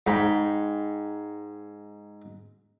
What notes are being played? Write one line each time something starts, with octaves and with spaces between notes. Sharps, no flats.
G#2 G5 B5